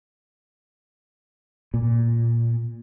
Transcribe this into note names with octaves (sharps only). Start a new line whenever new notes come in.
A#2